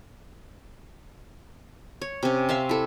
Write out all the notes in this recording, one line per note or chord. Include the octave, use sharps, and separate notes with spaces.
C#5
C3 C#4
E5 F5 A5 C6
E4 A4